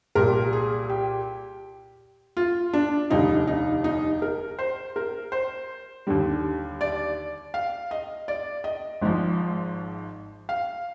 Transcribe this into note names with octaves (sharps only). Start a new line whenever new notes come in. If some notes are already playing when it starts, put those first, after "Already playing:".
C2 A#2 G3 A#4
G#4
G4
F4
D4
F1 D#2 D3 G3 D#4
D#4
D#4
A#4
C5
A#4
C5
D#2 D3 G3
D5
F5
D#5
D5
D#5
G#1 G#2 F3
F5